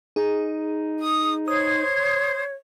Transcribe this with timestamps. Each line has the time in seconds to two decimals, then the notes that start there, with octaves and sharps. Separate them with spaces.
0.16 D#4 G#4
0.98 D#6
1.48 C5 C#5 D#6 G#6